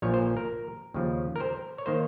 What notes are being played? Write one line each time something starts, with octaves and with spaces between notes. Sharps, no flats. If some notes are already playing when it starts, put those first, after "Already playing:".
A#1 A#2 F3 C#5
C5
A#4
D#2 C#3 F3
A#4
C5
C#5
D#3 A#3 C5